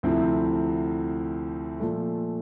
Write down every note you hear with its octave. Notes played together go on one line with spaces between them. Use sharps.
D2 C3 F3 C4 E4
A#2 F3 A3